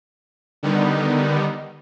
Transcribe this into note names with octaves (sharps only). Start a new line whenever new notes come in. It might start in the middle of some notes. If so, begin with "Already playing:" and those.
D3 D#3 G3 B3 D#4